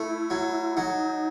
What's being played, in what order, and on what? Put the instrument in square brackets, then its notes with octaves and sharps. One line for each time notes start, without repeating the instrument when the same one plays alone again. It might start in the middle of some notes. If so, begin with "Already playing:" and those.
Already playing: [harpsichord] A3 [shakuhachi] E4
[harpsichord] F#3
[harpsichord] F#3 [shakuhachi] D#4